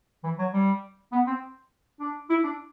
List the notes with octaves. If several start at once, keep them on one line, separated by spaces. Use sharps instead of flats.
E3
F#3
G3
B3
C4
D4
E4
D4